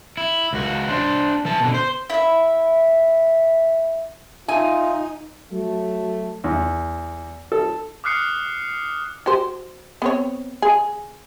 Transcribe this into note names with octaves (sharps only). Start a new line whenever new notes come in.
E4
C#2 F#4
D4 C5
E3 A5
B2 D3
C5
E4 E5
D#4 F4 E5 G#5
F#3 A3
E2
A4
D6 D#6 F6 F#6 C7 C#7
F#4 G4 C5
B3 C4 C#5
G#4